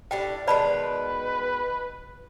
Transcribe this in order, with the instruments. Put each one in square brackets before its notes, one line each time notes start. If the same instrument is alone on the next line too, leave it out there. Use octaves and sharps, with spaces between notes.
[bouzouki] A2 G3 D4 [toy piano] G5
[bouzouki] B2 D#3 G#3 [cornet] B4 [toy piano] D5 A5 B5